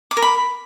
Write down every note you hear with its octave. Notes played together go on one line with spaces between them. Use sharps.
D6
A#4
B5